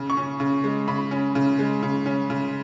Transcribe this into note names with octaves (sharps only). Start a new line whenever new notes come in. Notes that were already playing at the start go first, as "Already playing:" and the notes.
Already playing: C#3
C#6
C#4
C#3
G#3
C#3 B5
C#4
C#3
G#3
C#3
C#4
C#3